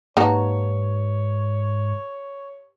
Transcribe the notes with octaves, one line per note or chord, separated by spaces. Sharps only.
G#2 A#3 D#4 F#4 G4 B4 C#5 A5